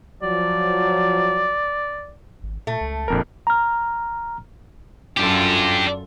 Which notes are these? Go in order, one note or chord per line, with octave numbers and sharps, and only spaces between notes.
F3 F#3 D5
G#1
A#2 A3
C#2
D1 A#1 F2 A#4
A#5 F6
F#2 D4 F4 G4 A4